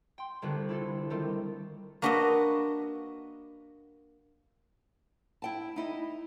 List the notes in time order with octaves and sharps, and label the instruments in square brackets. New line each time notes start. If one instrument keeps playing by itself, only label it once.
[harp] G5 C6
G1 C2 D3 D4 F#6
D4 E4 F4 A4
D#3 G3 A3 C4 F4
[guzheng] A#3 D4 F#4 B4 D5 D#5
[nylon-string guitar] E4 G5 A5
D#4 E4 D#5